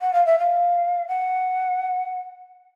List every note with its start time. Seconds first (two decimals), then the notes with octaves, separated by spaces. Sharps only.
0.01 F#5
0.13 F5
0.25 E5
0.38 F5
1.08 F#5